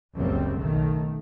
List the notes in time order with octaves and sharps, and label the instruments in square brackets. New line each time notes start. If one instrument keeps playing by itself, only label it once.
[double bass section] F#1 C#2 F#2 G3 C4
B1 D#3 A3